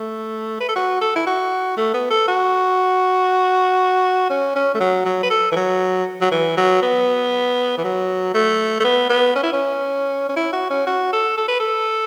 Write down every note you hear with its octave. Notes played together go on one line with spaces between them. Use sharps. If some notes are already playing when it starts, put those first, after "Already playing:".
Already playing: A3
B4
A4
F#4
A4
E4
F#4
A3
B3
A4
F#4
C#4
C#4
A3
F#3
F#3
B4
A4
E3
F#3
F#3
E3
F#3
B3
E3
F#3
A3
A3
B3
B3
C#4
E4
C#4
C#4
E4
F#4
C#4
F#4
A4
A4
B4
A4